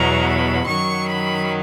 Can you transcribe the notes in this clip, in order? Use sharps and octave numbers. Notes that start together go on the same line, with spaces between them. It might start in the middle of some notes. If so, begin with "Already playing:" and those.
Already playing: E2 B2 F#3 A#5
B5
F#2 D#3 F#3 C#6
B5